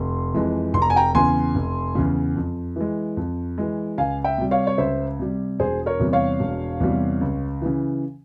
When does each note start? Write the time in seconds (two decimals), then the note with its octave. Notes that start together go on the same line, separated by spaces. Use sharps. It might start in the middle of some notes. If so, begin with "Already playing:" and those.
Already playing: F1 C6
0.34 F2 E3 G#3
0.74 F1 C6
0.82 A#5
0.90 G#5
0.96 G5 A#5
1.15 E2 C#3 G#5 C6
1.55 F1
1.95 E2 C#3
2.36 F2
2.76 E3 G#3
3.17 F2
3.58 E3 G#3
3.98 C#2 F5 G#5
4.24 E5 G5
4.38 C3 G3
4.51 C#5 F5
4.67 C#5
4.78 C#2 C5 E5
5.19 C3 G3
5.59 E1 G#4 C5
5.86 A#4 C#5
6.00 E2 C3 G3
6.13 C#5 F5
6.40 E1
6.80 E2 C3 G3
7.21 C#2
7.62 C#3 E3